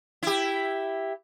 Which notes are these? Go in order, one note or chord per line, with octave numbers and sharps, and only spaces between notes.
E4 G4